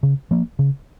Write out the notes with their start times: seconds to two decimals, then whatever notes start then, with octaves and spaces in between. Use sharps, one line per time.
0.03 C#3
0.31 F3 A#3
0.59 C#3